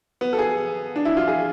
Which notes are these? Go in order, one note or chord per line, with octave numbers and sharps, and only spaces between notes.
B3
A4
G#4
D4
E4
F4
G#4